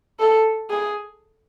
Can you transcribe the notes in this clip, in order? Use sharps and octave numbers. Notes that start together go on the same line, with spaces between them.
A4
G#4